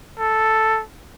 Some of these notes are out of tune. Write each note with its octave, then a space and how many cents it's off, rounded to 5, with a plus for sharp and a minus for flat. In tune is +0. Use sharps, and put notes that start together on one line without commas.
A4 +0